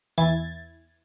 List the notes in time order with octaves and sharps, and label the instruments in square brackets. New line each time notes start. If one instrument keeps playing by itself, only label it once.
[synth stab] E2 E3 E4 G#6 A6